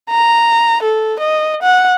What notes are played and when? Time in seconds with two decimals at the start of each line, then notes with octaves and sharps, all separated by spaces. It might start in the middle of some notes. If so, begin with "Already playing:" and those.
0.10 A#5
0.82 A4
1.20 D#5
1.62 F#5